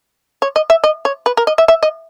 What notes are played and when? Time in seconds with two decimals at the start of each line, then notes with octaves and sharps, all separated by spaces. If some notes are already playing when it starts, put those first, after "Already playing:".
0.42 C#5
0.56 D#5
0.70 E5
0.84 D#5
1.05 C#5
1.26 B4
1.37 A#4
1.47 D#5
1.58 E5
1.68 E5
1.83 D#5